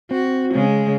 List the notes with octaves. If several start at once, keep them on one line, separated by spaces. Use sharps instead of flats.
C4 F#4
C#3 G#3